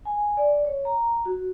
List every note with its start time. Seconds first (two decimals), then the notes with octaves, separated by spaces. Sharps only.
0.05 G#5
0.37 D5
0.65 C#5
0.85 A#5
1.26 F#4